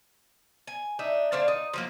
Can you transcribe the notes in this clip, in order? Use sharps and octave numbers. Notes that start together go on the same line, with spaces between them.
G#5
D4 D#4 E5
D3 D4 C5 F5
D#4
F3 F#3 A#3